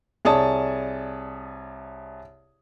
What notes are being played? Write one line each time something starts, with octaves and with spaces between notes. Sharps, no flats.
C2 G#4 C#5 D5 A5 D#6